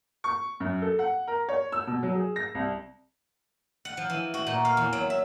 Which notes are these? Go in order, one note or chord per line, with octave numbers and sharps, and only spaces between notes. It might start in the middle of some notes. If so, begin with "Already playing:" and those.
C#6
F#2
A4
F#5
A#4
C#5
E6
B2
F#3
G#4
A#6
C2
F#5
F3
E3
F#4
A#2
F5
E2
F#3
E5